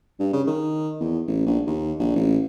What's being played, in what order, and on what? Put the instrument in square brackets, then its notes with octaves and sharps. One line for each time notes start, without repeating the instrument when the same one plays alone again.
[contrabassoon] G2
C#3
D#3
E2
A1
A#1
D#2
A#1
A1